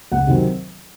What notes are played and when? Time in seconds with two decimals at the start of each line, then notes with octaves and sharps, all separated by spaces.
0.12 C#2 F#5
0.27 C3 D#3 F#3 C4